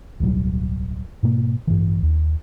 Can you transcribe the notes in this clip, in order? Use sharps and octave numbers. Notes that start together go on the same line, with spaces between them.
D1 B1 F#3 G3
G#2 B2 A#3
A1 G2 D#3 E3
D#2